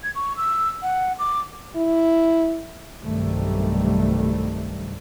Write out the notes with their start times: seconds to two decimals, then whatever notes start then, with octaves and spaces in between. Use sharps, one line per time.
0.03 G#6
0.15 C#6
0.37 E6
0.82 F#5
1.19 D6
1.76 E4
3.02 B1 G2 C3 D#3 G3 A3